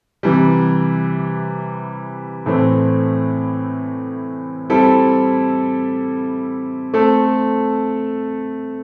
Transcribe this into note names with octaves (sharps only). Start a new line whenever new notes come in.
C3 E3 G3
A2 E3 A3 C4
G3 C4 E4 A4
A3 C4 A4